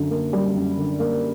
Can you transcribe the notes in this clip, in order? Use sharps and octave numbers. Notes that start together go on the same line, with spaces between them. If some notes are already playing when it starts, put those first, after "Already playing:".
Already playing: F#2 D3
A#3
G3
F#2
D3
A#3